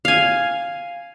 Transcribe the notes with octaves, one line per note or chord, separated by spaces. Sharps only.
F5 G#5